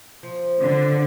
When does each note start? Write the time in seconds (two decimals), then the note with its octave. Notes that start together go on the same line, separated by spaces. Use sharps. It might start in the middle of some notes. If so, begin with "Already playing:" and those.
0.23 F3
0.62 D3